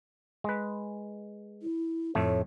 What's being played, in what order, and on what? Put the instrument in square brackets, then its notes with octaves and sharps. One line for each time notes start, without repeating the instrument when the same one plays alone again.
[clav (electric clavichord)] G#3 B4
[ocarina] E4
[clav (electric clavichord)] F2 A2 A3 [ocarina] C#5